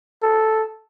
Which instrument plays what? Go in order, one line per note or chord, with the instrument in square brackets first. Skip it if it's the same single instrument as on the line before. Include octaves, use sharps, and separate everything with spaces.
[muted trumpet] A4